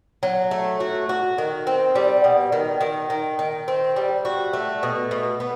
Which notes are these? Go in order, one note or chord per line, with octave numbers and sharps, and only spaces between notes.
F#3
A3
F#4
F#4
D#3
C4
G3
B2
D#3
D#3
D#3
D#3
C4
G3
F#4
A3
B2
B2
B3